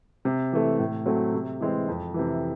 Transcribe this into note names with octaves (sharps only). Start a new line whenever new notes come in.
C3
E3 A3
A2
F#3 A3 C4
C3
E3 G#3 C4
F2
C3 E3